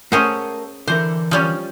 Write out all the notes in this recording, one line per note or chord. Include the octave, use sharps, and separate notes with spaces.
A3 C#4 G#4 A#4 C5 F#5
D3 E3 A#4 C5
F3 G3 C#4